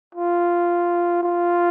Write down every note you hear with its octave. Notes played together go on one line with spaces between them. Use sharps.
F4
F4